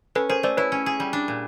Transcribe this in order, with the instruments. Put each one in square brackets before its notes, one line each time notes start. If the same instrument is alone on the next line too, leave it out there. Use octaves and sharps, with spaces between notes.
[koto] C#4 [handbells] A4 B4
[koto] G#4 [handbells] A#4 C5
[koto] A3 [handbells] C5 D5
[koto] E4 [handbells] B4 C#5
[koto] C#4
G#4
G3
D4
A#2